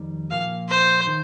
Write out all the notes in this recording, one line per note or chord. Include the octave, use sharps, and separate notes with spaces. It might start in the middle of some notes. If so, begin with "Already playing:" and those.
Already playing: F2 D#3 G3
A#2 F3 A#3 F5
C5
D#3